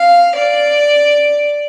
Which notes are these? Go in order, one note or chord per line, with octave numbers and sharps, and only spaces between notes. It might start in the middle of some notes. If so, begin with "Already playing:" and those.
Already playing: F5
D5